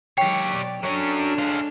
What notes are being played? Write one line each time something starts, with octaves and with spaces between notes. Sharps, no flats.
D#3 F#3 G#3 G4 C#5 G5
B2 D5
F#3 C#4 D4 A4 C#5
G#3 F5